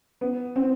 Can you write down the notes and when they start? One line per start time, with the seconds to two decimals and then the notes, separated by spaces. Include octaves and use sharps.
0.21 B3
0.56 C4